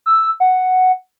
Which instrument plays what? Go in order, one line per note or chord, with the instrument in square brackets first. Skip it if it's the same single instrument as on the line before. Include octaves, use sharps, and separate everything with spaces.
[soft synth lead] E6
F#5